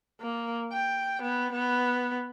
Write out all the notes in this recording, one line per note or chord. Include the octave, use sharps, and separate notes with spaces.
A#3
G5
B3
B3